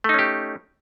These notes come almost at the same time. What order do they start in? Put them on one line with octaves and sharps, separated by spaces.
A3 D#4 C#4 G4